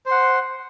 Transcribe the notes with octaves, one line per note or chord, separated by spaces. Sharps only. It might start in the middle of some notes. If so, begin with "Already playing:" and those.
C5 F#5 C6